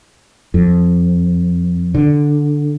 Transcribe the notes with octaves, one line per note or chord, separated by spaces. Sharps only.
F2
D3